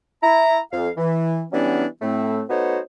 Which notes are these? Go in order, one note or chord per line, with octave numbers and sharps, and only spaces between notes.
E4 A#5
F2 F5
E3
E3 F#3 G3 B3 C#4 D4
A2 A3 C4
A3 B3 D#4 F#4 C5 C#5